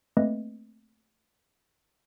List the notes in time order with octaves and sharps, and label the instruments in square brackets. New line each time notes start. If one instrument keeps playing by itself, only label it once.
[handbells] A3 A#3 C4 B4 D#5